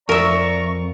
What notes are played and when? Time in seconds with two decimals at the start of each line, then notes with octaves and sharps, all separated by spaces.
0.09 F2 A#4 D5 E5 A#5 C#6